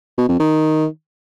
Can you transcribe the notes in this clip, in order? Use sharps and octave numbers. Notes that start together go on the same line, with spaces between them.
B2
F2
D#3